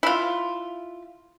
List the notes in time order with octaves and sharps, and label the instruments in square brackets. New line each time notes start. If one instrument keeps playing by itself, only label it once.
[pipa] E4 F4